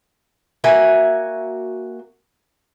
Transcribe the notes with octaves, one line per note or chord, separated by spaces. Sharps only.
A#3 F#4 E5 G#5